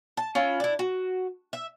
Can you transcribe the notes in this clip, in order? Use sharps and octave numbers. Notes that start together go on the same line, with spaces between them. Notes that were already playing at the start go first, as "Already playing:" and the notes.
A5
C#4 E4 F4
D4 E4
F#4
E5